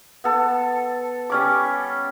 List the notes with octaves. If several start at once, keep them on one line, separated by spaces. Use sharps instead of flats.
B3 A4
G3 C#4 D6